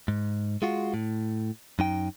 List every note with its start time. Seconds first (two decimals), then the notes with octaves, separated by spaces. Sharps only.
0.08 G#2
0.62 G#3 F4 F#4
0.94 A2
1.79 F#2 D#4 G5